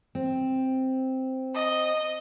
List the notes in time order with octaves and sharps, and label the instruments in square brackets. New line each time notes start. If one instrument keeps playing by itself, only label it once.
[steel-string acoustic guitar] C4
[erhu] D#5